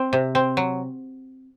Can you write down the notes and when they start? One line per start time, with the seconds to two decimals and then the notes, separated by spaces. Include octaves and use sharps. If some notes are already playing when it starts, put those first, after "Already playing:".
Already playing: C4
0.13 C3
0.35 C4
0.57 F#3